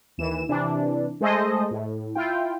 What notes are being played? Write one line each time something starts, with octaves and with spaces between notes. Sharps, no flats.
D#2 E3 E7
C3 E3 D4
G#3 A3 G#4 A4 C5 D#5
A2
E4 F4 G5